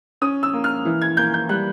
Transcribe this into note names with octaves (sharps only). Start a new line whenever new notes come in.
C#4 D#6
E6
A#3
F6
E3
G#6
A#3 G6
G6
G3 F#6